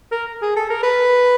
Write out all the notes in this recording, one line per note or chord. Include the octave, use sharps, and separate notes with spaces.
A#4
G#4
A4
A#4
B4